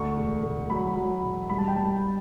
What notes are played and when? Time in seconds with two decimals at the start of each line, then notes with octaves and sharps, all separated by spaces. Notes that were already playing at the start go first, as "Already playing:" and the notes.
Already playing: D2 C#6
0.17 E1
0.43 D2
0.70 F#3 B5
0.96 F#3
1.22 E1
1.49 G2 B5
1.58 A5
1.68 G5
1.76 G2 A5